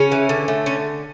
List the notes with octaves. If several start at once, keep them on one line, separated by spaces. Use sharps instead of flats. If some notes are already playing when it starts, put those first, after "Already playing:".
Already playing: C#3 C#4
E3
D3
A3
D3 C#4